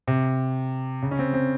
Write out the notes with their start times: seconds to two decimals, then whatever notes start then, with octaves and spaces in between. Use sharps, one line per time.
0.07 C3
1.02 C#3
1.11 C#4
1.19 C4
1.34 C4